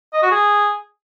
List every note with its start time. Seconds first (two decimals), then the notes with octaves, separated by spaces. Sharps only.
0.14 D#5
0.23 F#4
0.31 G#4